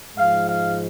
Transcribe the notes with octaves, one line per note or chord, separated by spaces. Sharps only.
G#2 F3 G#3 F5
F5